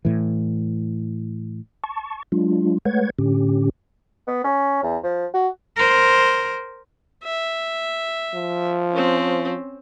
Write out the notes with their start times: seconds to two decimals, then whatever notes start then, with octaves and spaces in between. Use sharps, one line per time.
0.05 A2 E3
1.84 A5 C#6
2.32 F#3 G#3 D4 F4
2.85 G#3 A3 B4 C#5 F#5 G#6
3.19 A2 D3 C#4 G4
4.27 B3
4.44 C#4
4.83 E2
5.03 F3
5.34 F#4
5.76 A#4 C5
7.24 E5
8.35 F3
8.92 C4 C#4